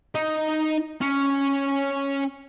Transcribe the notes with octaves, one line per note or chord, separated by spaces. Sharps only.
D#4
C#4